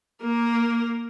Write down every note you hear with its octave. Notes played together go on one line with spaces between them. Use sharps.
A#3 A#4